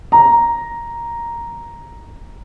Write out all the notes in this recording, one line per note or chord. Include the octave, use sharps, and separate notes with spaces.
A#5